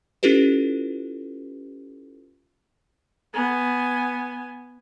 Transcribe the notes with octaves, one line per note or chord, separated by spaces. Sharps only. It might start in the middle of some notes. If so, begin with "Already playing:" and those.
C#4 E4 F4 G4 A4 B4
B3 G#5